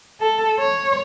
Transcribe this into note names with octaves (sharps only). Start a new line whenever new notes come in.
A4
C#5